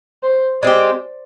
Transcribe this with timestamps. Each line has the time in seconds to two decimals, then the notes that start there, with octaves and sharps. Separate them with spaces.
0.23 C5
0.62 G#3 C4 G4 D5